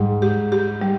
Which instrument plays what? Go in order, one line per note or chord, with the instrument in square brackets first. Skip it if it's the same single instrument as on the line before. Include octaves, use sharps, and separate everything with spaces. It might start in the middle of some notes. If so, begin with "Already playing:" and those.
Already playing: [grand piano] G#2 [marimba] G3
[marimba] G4
G4
G3